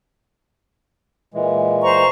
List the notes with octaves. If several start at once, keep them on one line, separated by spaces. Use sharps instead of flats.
A#2 E3 G#3
C5 A#5 C#6